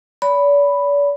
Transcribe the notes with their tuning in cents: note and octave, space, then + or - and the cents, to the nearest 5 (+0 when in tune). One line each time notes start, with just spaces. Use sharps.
D5 -45 B5 +0